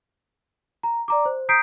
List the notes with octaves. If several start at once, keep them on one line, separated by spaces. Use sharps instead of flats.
A#5
D5 A#5 D6
C5
A#5 D#6 G6 B6 C7 D7